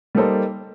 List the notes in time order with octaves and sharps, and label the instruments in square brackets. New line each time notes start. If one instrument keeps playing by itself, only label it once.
[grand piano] G3 A#3 D#4 A4 C5